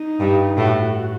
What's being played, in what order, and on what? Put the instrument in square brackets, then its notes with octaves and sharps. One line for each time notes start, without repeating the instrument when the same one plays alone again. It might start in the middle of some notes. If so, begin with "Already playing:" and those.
Already playing: [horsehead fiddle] D#4
[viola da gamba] G2
[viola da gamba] A2 [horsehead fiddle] F#4